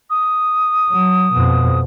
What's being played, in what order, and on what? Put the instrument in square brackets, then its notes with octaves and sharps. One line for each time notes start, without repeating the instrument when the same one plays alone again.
[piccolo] D#6
[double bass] F#3
F2 B2